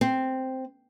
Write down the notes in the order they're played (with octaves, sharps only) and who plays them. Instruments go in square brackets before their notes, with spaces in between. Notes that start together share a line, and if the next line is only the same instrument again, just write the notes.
[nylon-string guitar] C4